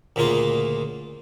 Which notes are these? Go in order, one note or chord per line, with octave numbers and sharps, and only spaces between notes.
D2 A#2 C#3 A#3 F4